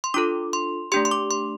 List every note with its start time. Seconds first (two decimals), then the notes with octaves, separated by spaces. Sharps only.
0.04 C6
0.14 D4 F4 A4 D6
0.53 C6
0.92 A3 D4 G4 C6
1.05 C6
1.11 D6
1.31 C6